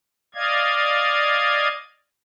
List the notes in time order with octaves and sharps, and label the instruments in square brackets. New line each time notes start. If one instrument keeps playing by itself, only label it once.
[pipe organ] D5 D#5 F5 G#6